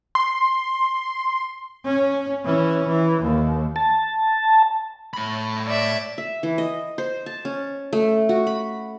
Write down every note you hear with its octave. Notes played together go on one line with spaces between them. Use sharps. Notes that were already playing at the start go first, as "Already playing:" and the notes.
C6
C#4
E3 C#4
E3
D#2
A5
A2 B5
D5 E5
E5
E3
D#5
C5
A5
C#4
A3
F#4
B5